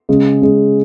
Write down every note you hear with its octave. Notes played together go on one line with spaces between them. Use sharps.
C#3 G#3
C#3 G#3